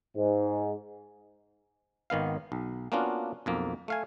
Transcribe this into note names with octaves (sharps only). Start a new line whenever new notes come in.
G#2
G#1 D#3 B3 F5
B1
A#3 B3 C#4 D4 F4 F#4
B1 F2 A#3
A3 F5 G#5